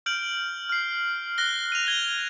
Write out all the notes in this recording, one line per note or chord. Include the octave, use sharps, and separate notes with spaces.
F6 G6 D7 F#7
F6 C7
F#6 A#6 G7
D#7 F7
G#6 G7